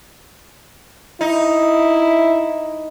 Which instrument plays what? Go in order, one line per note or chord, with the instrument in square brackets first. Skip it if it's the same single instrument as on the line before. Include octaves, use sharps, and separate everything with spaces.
[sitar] D#4 [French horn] E4